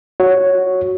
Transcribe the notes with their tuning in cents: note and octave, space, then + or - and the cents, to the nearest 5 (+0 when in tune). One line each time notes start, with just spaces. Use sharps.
F#4 -5 C#5 +0